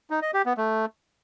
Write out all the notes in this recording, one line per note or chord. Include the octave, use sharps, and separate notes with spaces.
D#4
D#5
G4
B3
A3